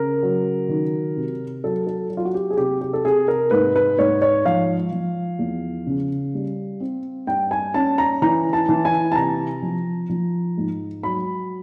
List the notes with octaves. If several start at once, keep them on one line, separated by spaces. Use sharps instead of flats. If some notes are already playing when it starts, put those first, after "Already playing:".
Already playing: C#3 A#4
F#3
D#3
C3
F#3 A4
A4
F#3
F4
F#4
G4
G#4
C3 G4
G4
A4
C3 G#4
A#4
G#2 B4
B4
G#2 C#5
C#5
F3 F5
F3
E2
C#3
G3
C4
G2 G5
G#5
C#4 A5
A#5
E3 A#5
A5
E3
G#5
A5
C3 A#5
F3
F3
G#2
F#3 B5